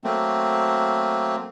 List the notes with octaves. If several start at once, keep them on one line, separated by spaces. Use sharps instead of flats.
F#3 A3 A#3 C4